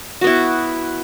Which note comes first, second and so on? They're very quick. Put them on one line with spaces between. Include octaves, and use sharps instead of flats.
F#4 B3 E4